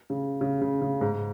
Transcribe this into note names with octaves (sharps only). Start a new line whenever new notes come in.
C#3
C#3
C#3
C#3
G#2